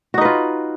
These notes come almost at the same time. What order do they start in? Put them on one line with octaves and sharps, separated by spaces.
F#4 D#4 B4 F4